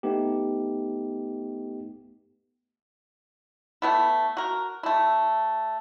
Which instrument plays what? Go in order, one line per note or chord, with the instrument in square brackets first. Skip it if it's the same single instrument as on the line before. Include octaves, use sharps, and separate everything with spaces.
[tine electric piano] A3 B3 D#4 G4
[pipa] A3 B3 E4
F#4 A#4
A3 E4